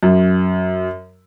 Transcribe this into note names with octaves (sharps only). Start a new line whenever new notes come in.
F#2